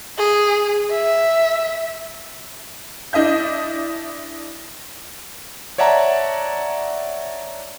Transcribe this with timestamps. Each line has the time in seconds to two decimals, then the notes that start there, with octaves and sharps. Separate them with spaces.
0.18 G#4
0.91 E5
3.13 D4 E4 D#5 E5 G6
5.78 C#5 D5 E5 F#5 A5 A#5